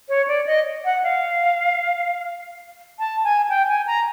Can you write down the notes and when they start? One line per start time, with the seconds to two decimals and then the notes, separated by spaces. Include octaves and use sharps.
0.09 C#5
0.28 D5
0.46 D#5
0.85 F#5
1.04 F5
2.99 A5
3.24 G#5
3.50 G5
3.68 G#5
3.87 A#5